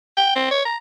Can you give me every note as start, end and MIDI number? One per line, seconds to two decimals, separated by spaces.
0.17 0.34 79
0.36 0.46 60
0.51 0.63 73
0.65 0.77 82